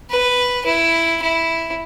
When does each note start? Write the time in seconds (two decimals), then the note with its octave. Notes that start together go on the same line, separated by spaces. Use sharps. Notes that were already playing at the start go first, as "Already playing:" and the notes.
0.10 B4
0.66 E4
1.22 E4